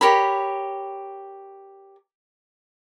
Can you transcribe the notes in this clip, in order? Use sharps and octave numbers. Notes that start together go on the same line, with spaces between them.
G4 A#4 C#5 B5